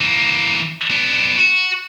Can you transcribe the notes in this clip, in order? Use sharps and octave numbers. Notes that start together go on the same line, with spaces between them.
E3 A#3
B3 D4
F#4